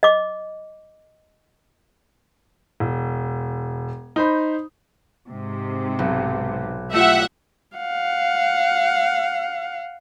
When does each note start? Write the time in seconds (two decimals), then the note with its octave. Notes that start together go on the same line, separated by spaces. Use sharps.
0.03 D#5 D6
2.80 E1
4.16 D#4 C5 B5
5.28 G#2 C3
5.99 B1
6.93 A3 F4 G4 E5 F#5
7.77 F5 F#5